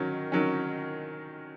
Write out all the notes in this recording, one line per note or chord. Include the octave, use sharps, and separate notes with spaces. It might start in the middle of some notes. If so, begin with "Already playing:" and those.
Already playing: D#3 F#3 C#4
D#3 F#3 C#4